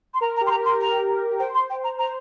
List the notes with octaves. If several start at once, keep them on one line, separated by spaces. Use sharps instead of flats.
C6
A#4 A#5
A#5
G4
C6
A#5
A#4 C6
A#5
C5 G5
C6
G5
A#5
C5 A#5